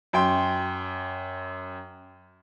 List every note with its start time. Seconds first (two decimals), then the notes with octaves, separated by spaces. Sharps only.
0.13 F#2 G5 C6